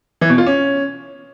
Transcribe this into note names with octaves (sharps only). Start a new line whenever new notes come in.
E3
B2
F4
C#4